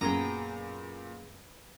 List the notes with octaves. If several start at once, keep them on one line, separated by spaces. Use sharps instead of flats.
F#2 A#2 B3 G#4 G5 A#5 A#6